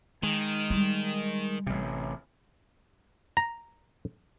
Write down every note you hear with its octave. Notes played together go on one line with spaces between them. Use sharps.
D#3 G#3
G3
A1 C3
A#5